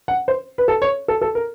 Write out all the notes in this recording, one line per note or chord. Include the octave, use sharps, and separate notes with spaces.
F#5
C5
B4
A4
C#5
A4
A4
A#4